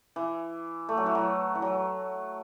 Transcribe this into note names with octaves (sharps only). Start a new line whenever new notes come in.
E3
A3
F#3
E3
F#3
E3
F#3